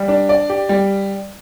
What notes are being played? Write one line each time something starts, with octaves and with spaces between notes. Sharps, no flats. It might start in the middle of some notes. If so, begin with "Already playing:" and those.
Already playing: G3
D4
D5
G4
G3